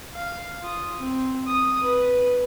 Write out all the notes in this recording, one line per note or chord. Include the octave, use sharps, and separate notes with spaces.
F5
F4 D#6
C4
D#6
B4